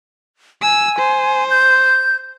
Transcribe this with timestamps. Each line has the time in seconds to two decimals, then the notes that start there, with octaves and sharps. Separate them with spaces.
0.62 G#5 E6
0.98 C5
1.50 G6